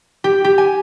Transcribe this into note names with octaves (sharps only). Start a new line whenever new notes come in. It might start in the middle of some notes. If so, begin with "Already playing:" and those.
G4
G4
G#5